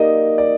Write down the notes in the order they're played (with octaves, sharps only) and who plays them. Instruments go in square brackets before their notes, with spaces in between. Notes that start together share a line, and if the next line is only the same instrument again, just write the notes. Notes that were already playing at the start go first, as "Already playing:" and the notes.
Already playing: [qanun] A#3 D#4 G4 A#4 [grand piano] D5 D#5
[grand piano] D5